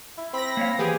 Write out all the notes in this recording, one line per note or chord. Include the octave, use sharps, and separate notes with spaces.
E4
C4 B5 A#6
A#3 C#5 F5
E3 B3 G4 G#4